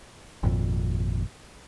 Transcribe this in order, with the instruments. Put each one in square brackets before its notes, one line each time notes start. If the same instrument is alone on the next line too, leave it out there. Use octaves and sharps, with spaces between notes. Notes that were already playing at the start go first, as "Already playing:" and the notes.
[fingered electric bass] G#1 F2 A#2